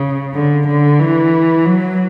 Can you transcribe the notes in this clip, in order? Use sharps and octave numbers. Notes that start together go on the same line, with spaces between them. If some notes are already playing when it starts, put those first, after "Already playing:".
Already playing: C#3
D3
D3
E3
F#3